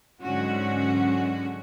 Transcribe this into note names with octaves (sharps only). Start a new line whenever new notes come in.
G#2 D3 F#3 G#3 C#4 F#4